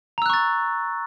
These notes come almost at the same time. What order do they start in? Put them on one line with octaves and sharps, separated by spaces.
A#5 E6 F#6 C#6 A6